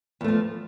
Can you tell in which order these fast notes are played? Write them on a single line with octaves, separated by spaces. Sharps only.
E2 A3 F3